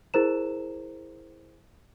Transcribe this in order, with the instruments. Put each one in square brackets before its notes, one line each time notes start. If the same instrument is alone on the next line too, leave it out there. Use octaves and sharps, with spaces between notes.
[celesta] E4 G#4 A#4 C5 A#5 E7